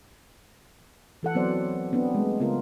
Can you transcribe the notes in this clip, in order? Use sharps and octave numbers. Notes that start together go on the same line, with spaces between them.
E3 A4 F#5
F#3 B3 C4 C5 D5
B3 C4 D4
G#3 A3
C#3 B3 F4 A#4